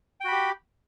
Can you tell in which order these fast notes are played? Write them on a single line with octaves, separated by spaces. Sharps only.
G5 F#4 B5 G4